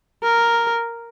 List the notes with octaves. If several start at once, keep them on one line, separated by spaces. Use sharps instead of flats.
A#4